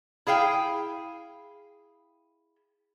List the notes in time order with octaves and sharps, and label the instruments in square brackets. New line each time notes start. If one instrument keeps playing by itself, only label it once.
[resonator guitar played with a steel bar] E4 G#4 F5 G5